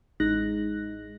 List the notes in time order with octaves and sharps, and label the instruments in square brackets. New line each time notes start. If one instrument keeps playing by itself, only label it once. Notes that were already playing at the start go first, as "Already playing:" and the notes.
[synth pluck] A1 G#3 D#4 F#6 A#6